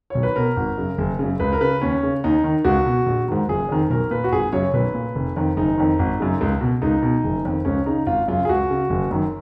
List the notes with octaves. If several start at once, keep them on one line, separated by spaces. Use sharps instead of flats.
B1 C#5
B4
B2 A#4
G#1
F#2 C#3
F#1
C#3
F#2
C#2 B4
A#4
C#3 B4
D#2 C#4
C#3
D#2 D#4
D#3
C#2 F#4
B2
A#1
G#2 D#3
F#1 G#4
F2 D#3
B1 A#4
A#2 B4
F#4
G#1 G#4
F#2 C#3 C#5
B1 B4
A#2
F1
F2 D#3
F#1 D#4
F2 D#3
G#1
F#2 C#3
C#2
B2
C#2 D#4
B2
F#1
F2 D#3
C#2 C#4
C#3 D#4
G#1 F4
F#2 C#3 F4
G#4
C#2 F#4
C#3
F#1
F#2 D#3